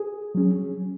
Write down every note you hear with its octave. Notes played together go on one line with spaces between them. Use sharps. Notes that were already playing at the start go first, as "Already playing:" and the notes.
Already playing: G#4
F#3 C#4